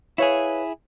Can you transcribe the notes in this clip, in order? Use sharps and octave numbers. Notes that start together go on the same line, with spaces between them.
E4 G#4 B4 C#5 F5